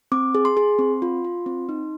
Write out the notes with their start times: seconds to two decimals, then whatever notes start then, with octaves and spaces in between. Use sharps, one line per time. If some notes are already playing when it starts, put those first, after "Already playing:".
0.12 C4 D6
0.35 G#4
0.45 C6
0.57 G#4
0.79 C4
1.02 F4
1.25 F4
1.46 C4
1.69 D#4